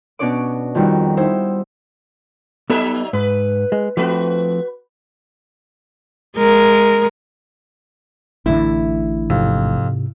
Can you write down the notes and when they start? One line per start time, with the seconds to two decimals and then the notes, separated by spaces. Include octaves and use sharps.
0.19 B2 C#4 D4 C#5 D5 D6
0.75 F2 D#3 G3 F#4
1.17 D#4 E4 C5 E5
2.70 F#3 B3 D#4 A4 B4 E5
3.13 G#2 B4
3.72 G#3
3.97 F3 A3 C4 F#4 B4
6.37 G#3 A#4
8.46 A1 A2 D3 E4
9.30 F2 G#2 C3